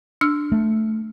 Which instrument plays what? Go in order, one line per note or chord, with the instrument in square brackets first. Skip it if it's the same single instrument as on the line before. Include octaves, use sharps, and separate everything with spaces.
[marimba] D4 E6 F6
[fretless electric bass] A3